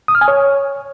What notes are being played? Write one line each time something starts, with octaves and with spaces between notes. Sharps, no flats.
D#6
F6
G#5
C#5